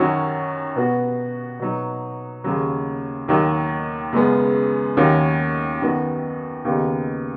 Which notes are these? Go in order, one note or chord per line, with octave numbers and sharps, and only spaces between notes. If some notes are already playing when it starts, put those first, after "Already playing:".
Already playing: F#2 D#3 F#3 C#4 F#4
B2 B3 F#4
B2 F#3 D#4
D#2 C#3 F#3
D#2 D#3 F#3
F#2 C#3 G#3 B3
D#2 D#3 F#3 C#4 F#4
F#2 D#3 B3 F#4
D#2 C#3 B3 D#4